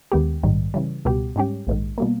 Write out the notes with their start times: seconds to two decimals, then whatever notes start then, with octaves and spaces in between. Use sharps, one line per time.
0.12 D#2 D#3 G#3 B3 G4
0.43 A#1 G#2 D#3 G3
0.74 C#3 E3 G3
1.05 C#2 B2 G3 B3 G4
1.36 G#2 G3 C#4 G4
1.67 A#1 G#2 D#3
1.98 B2 G3 A#3